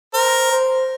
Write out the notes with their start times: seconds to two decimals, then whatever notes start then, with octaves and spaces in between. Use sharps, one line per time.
0.14 A#4 C5
0.51 C5